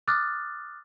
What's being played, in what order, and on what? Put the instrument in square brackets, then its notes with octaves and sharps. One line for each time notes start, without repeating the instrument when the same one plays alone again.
[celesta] D6 D#6 F6 F#6 A6